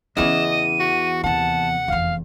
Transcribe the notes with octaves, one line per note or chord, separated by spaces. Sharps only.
E2 C#3 E3 C#4 D#5 E7
D#7
F#4
D#2 C3 F#5 A5
F1 E2 F5